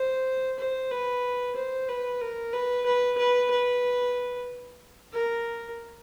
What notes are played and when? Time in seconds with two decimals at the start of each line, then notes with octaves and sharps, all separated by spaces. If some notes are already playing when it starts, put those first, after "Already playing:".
Already playing: C5
0.59 C5
0.91 B4
1.56 C5
1.88 B4
2.21 A#4
2.53 B4
2.86 B4
3.18 B4
3.50 B4
5.12 A#4